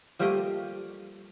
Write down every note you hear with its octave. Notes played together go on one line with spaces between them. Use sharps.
F3 G3 A3 A#3 G4 D#5